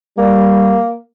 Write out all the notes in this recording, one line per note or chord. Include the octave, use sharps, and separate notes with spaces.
G3 A#3